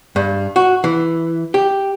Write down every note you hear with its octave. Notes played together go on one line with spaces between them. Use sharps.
G2
F#4
E3
G4